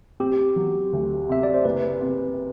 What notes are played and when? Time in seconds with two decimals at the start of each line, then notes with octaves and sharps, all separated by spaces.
0.20 C4 G4
0.56 F#3
0.93 D2
1.29 C3 E5
1.43 D5
1.54 C5
1.65 F#1 B4
2.01 C3